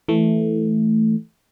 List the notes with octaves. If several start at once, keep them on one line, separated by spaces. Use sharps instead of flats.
E3 A3